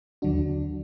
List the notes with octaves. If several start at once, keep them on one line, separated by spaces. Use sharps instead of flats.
D#2 D3 F#3 D4 F#4